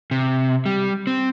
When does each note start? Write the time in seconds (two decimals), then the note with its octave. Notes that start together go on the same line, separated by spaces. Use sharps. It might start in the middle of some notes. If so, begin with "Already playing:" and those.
0.11 C3
0.66 G3
1.07 C4